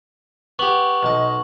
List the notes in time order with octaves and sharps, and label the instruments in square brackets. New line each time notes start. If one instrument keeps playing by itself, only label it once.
[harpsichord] B3 G4 [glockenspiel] C#6 F#7
[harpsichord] B1 A5 [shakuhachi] D#5